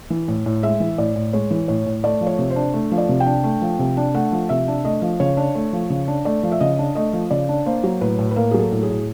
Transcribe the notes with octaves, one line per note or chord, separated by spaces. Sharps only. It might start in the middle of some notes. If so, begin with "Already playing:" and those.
E3
A2
A2
G#3 E5
E3
A2 D5
A2
G#3 C#5
E3
A2 C#5
A2
A3 D5
F3
C#5
C3
C5
D4
A3
F3
D5
C3
G5
D4
A3
F3
C3
D4
A3 F#5
F3
C3 E5
D4
A3 D#5
F3
C#3 C#5
D4
A3
F3
C#3
D4
A3 D5
F3
E5
C#3 D#5
D4
A3 D#5
F3
C#3 D5
D4
A#3 C5
F#3
A2 B4
A2
B4
A#3 A#4
F#3 G#4
A4
A2
G#4
A2